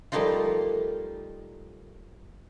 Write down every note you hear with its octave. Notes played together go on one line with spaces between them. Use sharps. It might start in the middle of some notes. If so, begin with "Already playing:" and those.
F3 G3 A3 A#3 D#4 F4